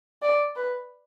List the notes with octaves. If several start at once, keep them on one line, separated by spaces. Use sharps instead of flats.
D5
B4